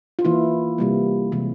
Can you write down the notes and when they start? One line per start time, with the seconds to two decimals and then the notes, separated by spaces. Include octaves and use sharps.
0.19 F4
0.25 E3 A#3 E4
0.78 C3 G3 A#3
1.32 C3 E3 G#3